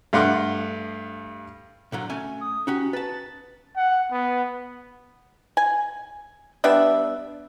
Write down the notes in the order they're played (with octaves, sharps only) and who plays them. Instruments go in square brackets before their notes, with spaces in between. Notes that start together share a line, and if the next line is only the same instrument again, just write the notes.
[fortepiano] G2 A3 F5 F#5 C6 D6
[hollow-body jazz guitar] A#2 D3 F#3
A3 C#4 G#5
[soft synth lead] D#6
[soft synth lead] C#4 [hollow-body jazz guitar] D#4 F#4 G4
[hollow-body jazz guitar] B4 A5 [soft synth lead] A6
[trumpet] F#5
B3
[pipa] G#5
G3 B3 D4 E5